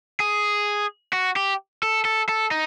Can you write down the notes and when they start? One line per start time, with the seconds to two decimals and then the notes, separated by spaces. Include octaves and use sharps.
0.20 G#4
1.13 F#4
1.36 G4
1.83 A4
2.05 A4
2.29 A4
2.51 D#4